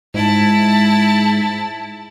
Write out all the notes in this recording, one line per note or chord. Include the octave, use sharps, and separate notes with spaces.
G#2 E4 A5